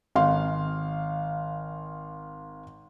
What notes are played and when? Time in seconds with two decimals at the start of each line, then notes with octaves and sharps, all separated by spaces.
0.16 G#1 F5 C6